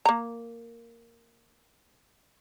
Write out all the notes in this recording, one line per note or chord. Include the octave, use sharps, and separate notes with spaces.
A#3 A#5